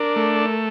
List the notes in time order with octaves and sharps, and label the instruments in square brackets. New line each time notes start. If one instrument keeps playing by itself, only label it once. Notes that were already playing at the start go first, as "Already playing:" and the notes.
Already playing: [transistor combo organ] D4 [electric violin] A#4
[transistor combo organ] A3